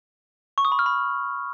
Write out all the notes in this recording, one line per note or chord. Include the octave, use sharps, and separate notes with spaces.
C#6
D#6
B5
F6
B5